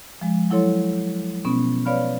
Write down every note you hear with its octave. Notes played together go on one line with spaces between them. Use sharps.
F3 G#3
F#3 E4 A4 C#5 C6
B2 B3 C#4
B4 C#5 D5 F5 B5 F6